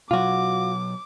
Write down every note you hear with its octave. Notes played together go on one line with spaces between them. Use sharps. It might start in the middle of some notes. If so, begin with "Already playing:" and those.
B2 F#3 F4 F#4 D6